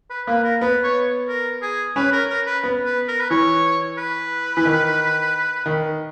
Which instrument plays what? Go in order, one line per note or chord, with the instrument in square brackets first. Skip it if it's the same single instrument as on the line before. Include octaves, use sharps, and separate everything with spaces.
[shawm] B4
[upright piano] A#3 [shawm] B4
[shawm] A#4
[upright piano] B3 [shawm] B4
[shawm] C#5
A#4
G#4
[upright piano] C#4 [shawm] B4
[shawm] A#4
A#4
B4
[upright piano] B3
[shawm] B4
A#4
B4
[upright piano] E3 [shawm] C#5
[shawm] B4
[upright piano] E3
D#3
D#3